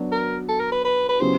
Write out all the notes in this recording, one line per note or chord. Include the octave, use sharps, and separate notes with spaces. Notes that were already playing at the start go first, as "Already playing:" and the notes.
Already playing: F#3 B3 D4 F#4
A#4
A4
A#4
B4
B4
B4
C#3 F#3 B3 E4 G4 C5